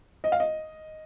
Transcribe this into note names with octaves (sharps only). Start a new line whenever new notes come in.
D#5
F5
D#5